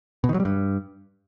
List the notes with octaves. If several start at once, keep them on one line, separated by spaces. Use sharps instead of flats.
B2
D#3
F#3
G3
G2